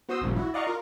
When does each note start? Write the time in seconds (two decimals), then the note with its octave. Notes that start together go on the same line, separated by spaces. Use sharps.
0.09 B3 F#4 C5 C6 D#6 E6
0.21 G#1 C#2 G2 A#2 F3
0.36 E4 F#4
0.54 D5 D#5 F5 F#5 A#5 C#6
0.67 F4 A#4